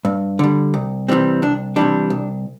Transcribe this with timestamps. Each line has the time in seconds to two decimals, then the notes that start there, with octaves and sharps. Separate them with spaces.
0.05 G2
0.39 D3 G3
0.74 C2
1.08 C3 E3 G3 C4
1.42 C2 D4
1.76 C3 E3 G3 D4
2.10 C2